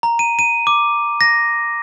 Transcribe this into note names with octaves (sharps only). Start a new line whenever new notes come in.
A#5
D#7
D#7
D6
A#6